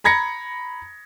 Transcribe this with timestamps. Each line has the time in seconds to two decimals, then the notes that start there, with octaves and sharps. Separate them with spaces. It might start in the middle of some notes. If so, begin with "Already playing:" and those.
0.04 A#5 B5 G#6 A#6 C#7